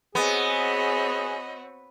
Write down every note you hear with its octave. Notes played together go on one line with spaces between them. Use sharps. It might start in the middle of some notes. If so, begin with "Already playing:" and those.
B3 C4 F#4 G#4 C#5 D#5